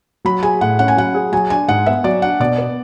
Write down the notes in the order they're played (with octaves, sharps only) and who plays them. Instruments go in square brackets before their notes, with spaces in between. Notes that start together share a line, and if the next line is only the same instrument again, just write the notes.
[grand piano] F#3 [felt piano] B5
[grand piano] G#4 [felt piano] G#5
[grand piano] A2 [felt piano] F#5
[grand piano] C#4 [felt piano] F#5
[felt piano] G#5
[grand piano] F#3 [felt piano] F#5
[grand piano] G#4
[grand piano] F#3 [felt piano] G#5
[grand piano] D4 [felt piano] G#5
[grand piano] G#2 [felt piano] F#5
[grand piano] B3 [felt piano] E5
[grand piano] F#3 [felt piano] D5
[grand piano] D4 [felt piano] F#5
[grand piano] B2 [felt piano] D5
[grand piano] B3